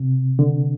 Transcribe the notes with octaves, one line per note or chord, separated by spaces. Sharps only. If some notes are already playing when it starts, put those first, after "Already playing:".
Already playing: C3
D3